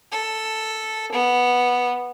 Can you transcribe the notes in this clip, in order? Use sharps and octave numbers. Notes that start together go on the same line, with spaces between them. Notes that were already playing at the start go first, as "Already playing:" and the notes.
A4
B3